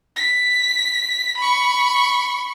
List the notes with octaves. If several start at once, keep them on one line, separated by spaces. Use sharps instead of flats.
B6
B5 C#6